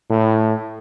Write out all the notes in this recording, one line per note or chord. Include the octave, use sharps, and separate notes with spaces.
A2